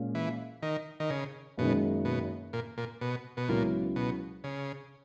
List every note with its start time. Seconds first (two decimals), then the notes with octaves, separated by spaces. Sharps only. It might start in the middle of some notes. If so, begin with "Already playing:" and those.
Already playing: A#2 G#3 C#4
0.15 E3
0.62 D#3
1.00 D#3
1.10 C#3
1.57 F#1 F#2 B2 D#3 G#3
2.05 B2
2.53 A#2
2.78 A#2
3.01 B2
3.37 B2
3.48 C#2 A#2 C#3 F#3 B3 E4
3.96 B2
4.44 C#3